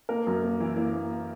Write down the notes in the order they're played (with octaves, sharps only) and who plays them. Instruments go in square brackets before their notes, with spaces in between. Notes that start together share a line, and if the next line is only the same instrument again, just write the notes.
[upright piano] A#3 A#4
F#2
A#3
E3
A#3
A#3